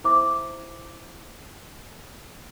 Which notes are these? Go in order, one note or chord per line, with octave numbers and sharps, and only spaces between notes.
E4 C5 E5 D6